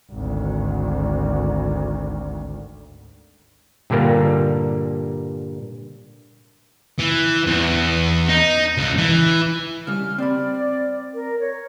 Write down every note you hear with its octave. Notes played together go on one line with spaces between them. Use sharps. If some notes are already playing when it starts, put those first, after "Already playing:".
G#1 D2
G2 A#2 D3 G3 A#3
E3
E2
D#4
C#2
E3
C#3 G3 F6
C4 D5 B5
A#4
C#5